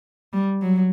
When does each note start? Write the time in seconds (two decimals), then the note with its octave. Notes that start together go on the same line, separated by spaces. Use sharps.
0.33 G3
0.62 F#3